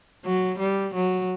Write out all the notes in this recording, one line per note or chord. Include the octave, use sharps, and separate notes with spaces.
F#3
G3
F#3